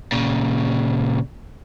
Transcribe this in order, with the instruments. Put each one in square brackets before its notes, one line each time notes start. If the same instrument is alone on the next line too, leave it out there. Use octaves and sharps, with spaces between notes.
[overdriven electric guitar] A#2 C#3